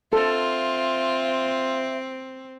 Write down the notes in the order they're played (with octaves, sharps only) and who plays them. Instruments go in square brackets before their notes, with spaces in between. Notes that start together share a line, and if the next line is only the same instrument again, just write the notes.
[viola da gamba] C4 [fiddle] F4 [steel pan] A4 [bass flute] E5